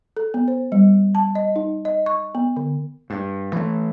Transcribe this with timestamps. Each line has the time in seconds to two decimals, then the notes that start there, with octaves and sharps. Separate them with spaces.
0.16 A4
0.34 B3
0.48 C5
0.72 G3
1.15 A5
1.35 D#5
1.56 D#4
1.85 D#5
2.06 C#6
2.35 B3
2.56 D3
3.10 G2
3.53 E3 A3